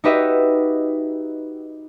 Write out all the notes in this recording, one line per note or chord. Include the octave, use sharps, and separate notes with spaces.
D#4 F#4 G4 B4 D#5 E5